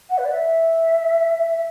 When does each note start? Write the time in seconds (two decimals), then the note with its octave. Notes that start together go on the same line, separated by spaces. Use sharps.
0.10 F#5
0.18 B4
0.25 D5
0.32 E5